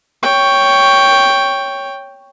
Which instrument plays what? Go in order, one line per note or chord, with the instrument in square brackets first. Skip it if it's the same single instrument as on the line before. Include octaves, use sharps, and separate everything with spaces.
[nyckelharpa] C#5 G5